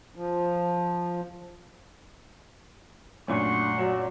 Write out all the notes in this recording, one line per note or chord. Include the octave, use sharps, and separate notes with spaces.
F3
F#2 A#2 A3 C#4 D4 F#5 C6 C#6
F#3 F#4 D5